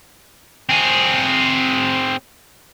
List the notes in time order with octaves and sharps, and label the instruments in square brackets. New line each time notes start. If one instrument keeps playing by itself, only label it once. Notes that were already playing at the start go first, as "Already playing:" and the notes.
[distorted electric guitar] C4 G#4